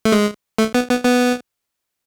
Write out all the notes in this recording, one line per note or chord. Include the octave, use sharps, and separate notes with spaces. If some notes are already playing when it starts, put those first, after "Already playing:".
A3
G#3
A3
B3
B3
B3